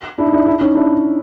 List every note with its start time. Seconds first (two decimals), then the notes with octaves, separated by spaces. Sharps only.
0.18 D4 E4
0.26 D#4
0.33 D4 E4
0.46 D4 E4
0.61 C#4 D#4
0.75 D4 E4